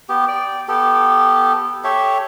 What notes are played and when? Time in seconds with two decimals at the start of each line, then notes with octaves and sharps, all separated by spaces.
0.09 B3 G4
0.28 D5 G5
0.68 B3 G4 A4
1.84 G4 A4 C#5 E5